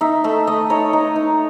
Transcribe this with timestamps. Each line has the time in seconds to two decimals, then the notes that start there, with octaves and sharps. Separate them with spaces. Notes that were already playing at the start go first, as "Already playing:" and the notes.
0.01 D#4 E5
0.24 A3 E5
0.47 A3 D#5
0.70 D#4 C#5
0.93 D#4
1.16 D#4